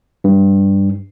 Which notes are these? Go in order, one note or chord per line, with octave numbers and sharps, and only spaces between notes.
G2